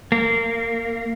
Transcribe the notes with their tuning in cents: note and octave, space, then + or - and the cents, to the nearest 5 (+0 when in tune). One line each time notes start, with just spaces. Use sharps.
A#3 -25